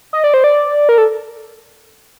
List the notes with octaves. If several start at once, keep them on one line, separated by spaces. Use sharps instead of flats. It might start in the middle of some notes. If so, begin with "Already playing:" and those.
D#5
D5
C5
D5
A#4
A4